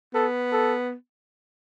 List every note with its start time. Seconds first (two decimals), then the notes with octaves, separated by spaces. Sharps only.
0.14 B3 A4
0.52 A4